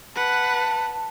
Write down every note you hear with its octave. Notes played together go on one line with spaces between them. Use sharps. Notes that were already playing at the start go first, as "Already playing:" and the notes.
B4 F#5 A5